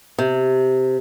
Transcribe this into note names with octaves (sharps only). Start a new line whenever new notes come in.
C3